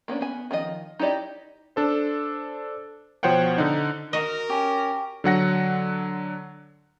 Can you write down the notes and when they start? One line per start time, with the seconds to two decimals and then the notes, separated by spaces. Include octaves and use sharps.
0.08 A#3 B3 C#4 D4
0.21 B3 G#5
0.51 D#3 F3 F#4 D#5
0.99 D#4 E4 G4 D5 D#5
1.76 D4 A4 C5
3.23 B2 F3 C5 C#5 F#5 G5
3.58 D3 D#4
4.13 F#4 A#4 D#5
4.50 C#4 G4
5.24 D3 F#3 F#5 A#6